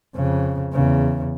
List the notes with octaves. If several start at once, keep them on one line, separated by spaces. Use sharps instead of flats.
F2 C#3
E2 C#3